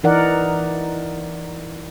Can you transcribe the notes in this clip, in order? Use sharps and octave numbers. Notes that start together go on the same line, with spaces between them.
E3 D#4 A#4 D5 F#5